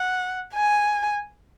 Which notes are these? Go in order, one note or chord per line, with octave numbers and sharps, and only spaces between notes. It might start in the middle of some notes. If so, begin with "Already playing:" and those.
Already playing: F#5
G#5